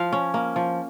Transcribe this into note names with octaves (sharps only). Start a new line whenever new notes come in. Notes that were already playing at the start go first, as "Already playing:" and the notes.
Already playing: F3 F5
C#4
A#3
F3